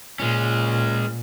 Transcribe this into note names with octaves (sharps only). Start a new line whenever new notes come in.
A#2 G#3 C#4